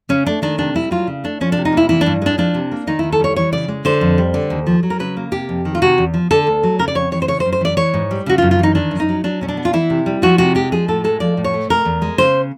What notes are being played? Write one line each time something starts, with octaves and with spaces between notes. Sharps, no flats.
C#3 C#4
A3 D4
D#3 D4
C3 D4
G3 E4
F#3 F4
C#3
A3 D4
F3 C#4
D4
C3
D#4
A#3 E4
E3 E4
D4
G2
G#3 D4
F3 D4
C3
A#3
D#3 D#4
D#2 E4
A4
G3 C#5
E3 C#5
C#3 D5
G#3
D3 C5
F2
G3
D3
D#2
F3
F#3
A#4
C#3 B4
A#3
C3 G4
F2
D#3
F4
C3 F#4
E2
F3
D3 A4
D2
F#3
C#3 A#4
D5
F2 C#5
E3 C#5
C5
C#3 C#5
C5
F#2
C5
E3 D5
E3 C#5
G#2
G3
C#3 F#4
F4
F#2
F4
E3 D#4
D#3 D4
F#2
D#4
F#3
F#3 D4
B2 C#4
D4
B3
F4
E3 E4
C3
G3
F3 F#4
C3 F#4
G#3 G4
F3 G#4
A2 A4
G#3 A4
F3 D5
A2
C#5
A3
B2 A#4
E2
G#3
C#3 C5